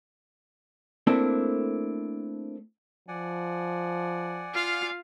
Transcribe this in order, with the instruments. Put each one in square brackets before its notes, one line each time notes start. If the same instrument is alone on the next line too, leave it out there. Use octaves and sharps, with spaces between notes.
[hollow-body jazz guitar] A3 A#3 C4 D4 E4 A4
[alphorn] F3 [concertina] D5 F#5 G#5
[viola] F4 F5